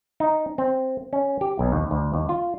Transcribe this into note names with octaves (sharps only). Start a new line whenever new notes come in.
D#4
C4
C#4
G4
B1
D#2
D2
D#2
F4